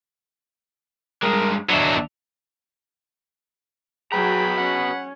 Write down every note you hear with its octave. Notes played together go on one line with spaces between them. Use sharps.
G2 G#3 A#4
D#2 F#3 B3 D4 E5
F#3 F#4 G#4 B4 G5 A#5 B5
C#4 F#5